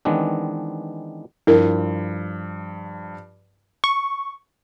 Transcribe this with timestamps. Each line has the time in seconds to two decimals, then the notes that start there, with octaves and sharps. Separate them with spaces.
0.05 D#3 E3 G#3 B3 C4 D4
1.47 G2 F3 E4 A#4
3.84 C#6